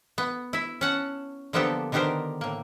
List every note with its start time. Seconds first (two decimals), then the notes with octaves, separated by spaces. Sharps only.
0.18 B3
0.53 E4 E5
0.81 C#4 F#5 A5
1.53 D3 F3 A#3 B3 G4 A4
1.92 D3 D#3 B3 G4 A#4 C5
2.41 A2 A#3